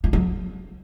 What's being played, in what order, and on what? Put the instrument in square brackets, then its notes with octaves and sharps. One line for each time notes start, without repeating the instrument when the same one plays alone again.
[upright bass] F3
F#3